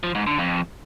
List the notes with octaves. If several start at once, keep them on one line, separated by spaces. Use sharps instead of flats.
F3
G#2
D3
F2